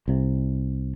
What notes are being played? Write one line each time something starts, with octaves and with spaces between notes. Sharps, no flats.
C2 C3